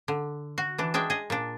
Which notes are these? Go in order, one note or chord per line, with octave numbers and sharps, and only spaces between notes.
D3
F#4
E3 D4
G#3 D4 E5 G5
G#4 D#5
A#2 D4